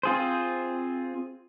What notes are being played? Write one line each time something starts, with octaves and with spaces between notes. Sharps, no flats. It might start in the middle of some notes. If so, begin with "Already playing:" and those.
C4 F4 G#4 C5